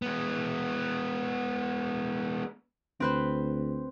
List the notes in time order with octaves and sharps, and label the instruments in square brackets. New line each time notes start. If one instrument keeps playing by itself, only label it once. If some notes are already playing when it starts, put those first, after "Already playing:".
[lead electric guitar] G#3 B3
[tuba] D2 [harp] C4 B4 C5